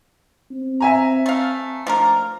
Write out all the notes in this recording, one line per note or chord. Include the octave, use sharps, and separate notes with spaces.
C4
E5 G#5 A#5
A3 F5
F3 A3 D4 A#4